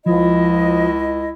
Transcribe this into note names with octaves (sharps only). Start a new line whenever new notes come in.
C#2 F3 E4 D#5